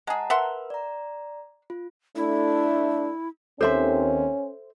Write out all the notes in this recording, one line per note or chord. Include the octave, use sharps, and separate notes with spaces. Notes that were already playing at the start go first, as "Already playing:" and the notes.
G#3 G#4 F#5 A5 A#5
A#4 B4 E5 F#5 C6
D5 A#5
F4
A3 D4 E4
D#2 C4 C#4 A4 C5 E5 C6